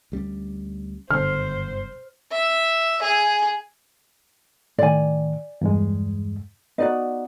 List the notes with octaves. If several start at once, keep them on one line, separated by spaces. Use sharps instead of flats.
D2 G3 C#4
F#1 G2 D3 B3 C5 F6
E5
G#4
A2 D#3 D5 G#5
E2 G2 G#3
B3 D#4 F#4 D5 D#5